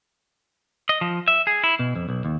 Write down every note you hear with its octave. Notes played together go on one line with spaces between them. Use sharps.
D#5
F3
E5
G#4
E4
B2
F2
B1
D#2